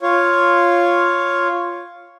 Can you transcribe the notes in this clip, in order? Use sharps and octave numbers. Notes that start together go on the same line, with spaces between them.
F4 C#5